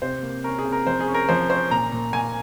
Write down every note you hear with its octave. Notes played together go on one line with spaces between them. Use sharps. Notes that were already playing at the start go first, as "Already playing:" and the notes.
C3 C5
A#3
C#4 A#4
G#4
C3
A#4
F3 C5
G#4
C#4
A#4
F3 C5
C#4 C5
A#2 A#5
A#2
A#2 G#5